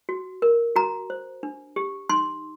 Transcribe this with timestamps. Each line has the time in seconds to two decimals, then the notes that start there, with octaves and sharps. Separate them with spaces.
0.09 F#4
0.42 A#4
0.76 F#4 A#5
1.10 C5
1.43 D4
1.76 G4
2.09 D#4 C6